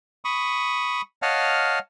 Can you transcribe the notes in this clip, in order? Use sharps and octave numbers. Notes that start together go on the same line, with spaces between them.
B5 C#6 D#6
C#5 D#5 F5 F#5 A5 F6